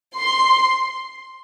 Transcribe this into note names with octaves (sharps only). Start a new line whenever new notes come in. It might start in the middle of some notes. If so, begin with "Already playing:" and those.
C6